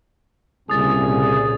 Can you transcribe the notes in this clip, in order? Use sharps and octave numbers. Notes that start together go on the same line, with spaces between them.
C2 A#2 C#3 G#4 D#6 A6